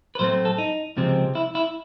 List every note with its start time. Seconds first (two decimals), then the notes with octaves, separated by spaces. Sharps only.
0.15 B4
0.19 A2 F#3 A3 C4 C5
0.45 A4
0.58 D#4
0.97 C#2 C3 F3 G#3 C4
1.35 E4
1.55 E4